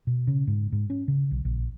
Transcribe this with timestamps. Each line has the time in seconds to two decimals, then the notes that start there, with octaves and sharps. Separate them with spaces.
0.07 B2
0.27 C#3
0.47 G#2
0.72 G#2
0.90 C#4
1.08 C#3
1.31 B1
1.45 A#1